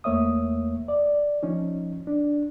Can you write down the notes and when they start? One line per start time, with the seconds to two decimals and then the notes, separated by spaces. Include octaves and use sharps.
0.04 E2 A3 A#3 C#5 E5 D#6
0.88 D5
1.43 F3 C#4 D#4
2.07 D4